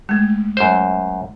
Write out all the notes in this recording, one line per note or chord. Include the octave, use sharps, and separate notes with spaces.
G#3 A3
F#2 C5